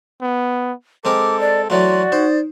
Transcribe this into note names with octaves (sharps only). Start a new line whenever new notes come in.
B3
G#3 C4 A4 A#4 D6
D5
E3 F#3 A3 F#4 D5 C6
D#4 C5